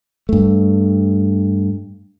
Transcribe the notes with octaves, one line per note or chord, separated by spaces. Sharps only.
G2 A3